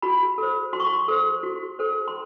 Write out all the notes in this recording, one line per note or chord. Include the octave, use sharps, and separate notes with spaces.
F#4 B5
A4 C5
F#4 C6
C#6
C6
A4 C5
F#4
A4 C5
C6